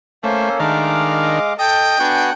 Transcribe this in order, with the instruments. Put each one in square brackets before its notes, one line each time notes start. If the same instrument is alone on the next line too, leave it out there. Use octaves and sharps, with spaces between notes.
[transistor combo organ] A3 [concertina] A#3 C#4 A4 [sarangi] C5
[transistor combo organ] D#3 D4 A#4 [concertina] G#3 F5 D6 [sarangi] A3
[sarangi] D#5
[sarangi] A4 [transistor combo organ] D#5 [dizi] G5
[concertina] B3 F#4 G#5 [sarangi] D4 [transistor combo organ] F#5